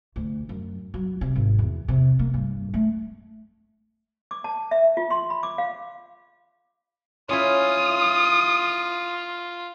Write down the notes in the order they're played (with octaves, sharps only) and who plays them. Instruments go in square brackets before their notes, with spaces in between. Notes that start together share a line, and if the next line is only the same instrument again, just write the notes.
[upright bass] D2
F#2
F#3
C3
G#1
E2
C3
A#3
G2
A3
[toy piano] D6
A5
E5
F4
C6
B5
D6
F5
[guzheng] C#4 E4 [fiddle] F4 [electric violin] D#6